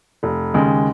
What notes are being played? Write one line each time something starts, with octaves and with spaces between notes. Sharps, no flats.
F1
D#2 C#3 G#3